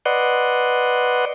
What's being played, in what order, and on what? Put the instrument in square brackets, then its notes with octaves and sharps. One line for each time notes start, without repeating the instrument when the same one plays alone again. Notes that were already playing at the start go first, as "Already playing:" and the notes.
[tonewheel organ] B4 D5 D#5 F#5 C6